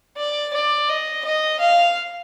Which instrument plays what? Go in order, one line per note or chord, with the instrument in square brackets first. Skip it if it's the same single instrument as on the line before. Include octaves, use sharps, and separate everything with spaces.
[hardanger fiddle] D5
D5
D#5
D#5
F5